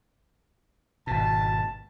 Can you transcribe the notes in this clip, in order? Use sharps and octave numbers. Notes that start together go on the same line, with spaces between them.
G#1 B2 A5